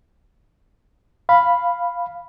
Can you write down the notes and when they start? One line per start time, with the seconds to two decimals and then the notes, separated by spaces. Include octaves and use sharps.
1.29 F5 B5